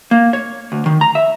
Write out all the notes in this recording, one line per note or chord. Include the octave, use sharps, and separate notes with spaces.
A#3
C#5
D2
D#3
A#5
E5